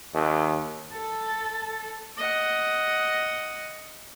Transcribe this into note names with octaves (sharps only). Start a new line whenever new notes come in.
D#2
A4
D#5 F#5